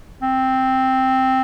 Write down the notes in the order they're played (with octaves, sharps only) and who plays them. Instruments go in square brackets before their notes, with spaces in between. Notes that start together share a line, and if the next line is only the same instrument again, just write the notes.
[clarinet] C4